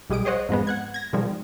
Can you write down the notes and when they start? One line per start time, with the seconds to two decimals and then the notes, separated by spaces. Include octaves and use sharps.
0.10 B1 G3 G#3 G4 D#6 D7
0.25 G#4 C5 C#5 D#5 F#5
0.49 F2 G#2 G#3 B3
0.67 F#5 F#6 G#6
0.94 G#6 A#6
1.13 B2 D#3 F3 G3 G#3